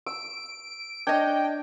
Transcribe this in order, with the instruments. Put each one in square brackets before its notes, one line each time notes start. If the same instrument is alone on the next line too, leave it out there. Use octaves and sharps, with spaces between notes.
[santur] E6 [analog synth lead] D7
[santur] D4 [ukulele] C#5 D#5 [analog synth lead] G5